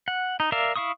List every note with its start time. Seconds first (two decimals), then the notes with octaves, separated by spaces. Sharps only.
0.08 F#5
0.40 D#4
0.52 A#4 D5 E5 F5
0.76 E4 F5 C#6 D#6